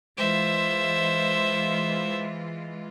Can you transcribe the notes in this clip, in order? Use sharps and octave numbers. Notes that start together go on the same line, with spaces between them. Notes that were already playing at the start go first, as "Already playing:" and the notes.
E3 G#3 F4 C5 E5